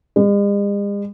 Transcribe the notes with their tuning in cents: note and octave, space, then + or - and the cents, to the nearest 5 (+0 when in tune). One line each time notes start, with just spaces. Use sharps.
G#3 -45